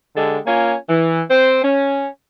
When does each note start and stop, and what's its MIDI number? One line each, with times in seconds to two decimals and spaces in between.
0.16 0.38 50
0.16 0.38 56
0.16 0.38 67
0.16 0.38 69
0.46 0.74 58
0.46 0.74 61
0.46 0.74 65
0.46 0.74 80
0.88 1.21 52
1.30 1.62 60
1.30 1.62 72
1.63 2.06 61